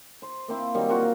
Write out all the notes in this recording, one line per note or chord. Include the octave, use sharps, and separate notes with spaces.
C5
A#3 C4 E4
D#3 F#3 G3 C4
A#3 C4 F4 F#4